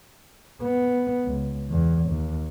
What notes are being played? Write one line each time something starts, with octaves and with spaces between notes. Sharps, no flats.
B3
C#2
E2
D#2